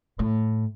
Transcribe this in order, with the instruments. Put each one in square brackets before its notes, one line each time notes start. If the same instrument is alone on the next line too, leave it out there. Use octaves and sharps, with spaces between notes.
[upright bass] A2